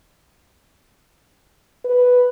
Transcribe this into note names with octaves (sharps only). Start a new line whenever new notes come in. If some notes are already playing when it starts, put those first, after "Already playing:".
B4